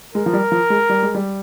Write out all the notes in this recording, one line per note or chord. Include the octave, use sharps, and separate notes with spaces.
G#3 A#4
F3
G3
F3
G#3
G3
G#3
G3